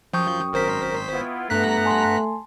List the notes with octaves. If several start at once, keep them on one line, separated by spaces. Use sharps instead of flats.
F#2 F3 G5 C#6 D#6 G6
G#1 A#4 C5 B6
B3 E4 F4
G2 A3 B3 F#5 A#5 F#6 B6
G#5 A5 C6